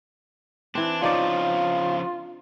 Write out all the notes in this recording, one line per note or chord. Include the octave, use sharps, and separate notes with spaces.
E3 C4 D4
C#3 F3 D4 D#4 F4 D5